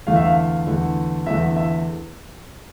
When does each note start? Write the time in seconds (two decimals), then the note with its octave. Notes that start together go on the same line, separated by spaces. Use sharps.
0.07 E2 D3 A3 F5
0.16 E5
0.25 F5
0.67 E2 D3 A3
1.26 E2 D3 A3 E5
1.56 E5